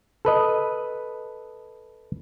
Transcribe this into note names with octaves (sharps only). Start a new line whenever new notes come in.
A4 B4 D#5